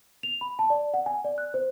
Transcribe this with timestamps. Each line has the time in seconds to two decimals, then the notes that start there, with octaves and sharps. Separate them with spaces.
0.23 F7
0.41 B5
0.59 A5
0.70 D5
0.94 F#5
1.06 G#5
1.24 D5
1.38 F#6
1.54 C5